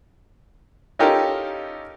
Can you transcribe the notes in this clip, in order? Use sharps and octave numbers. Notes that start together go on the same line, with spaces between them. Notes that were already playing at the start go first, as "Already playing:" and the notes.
C#4 D#4 F4 G4 A4 A#4